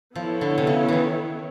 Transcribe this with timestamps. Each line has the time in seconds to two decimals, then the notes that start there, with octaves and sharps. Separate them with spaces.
0.15 F3 B3 E4 A4 C#5
0.41 D3
0.58 C3
0.67 C#3
0.88 D#3 E3